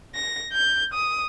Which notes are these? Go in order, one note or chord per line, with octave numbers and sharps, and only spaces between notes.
A#6
G6
D#6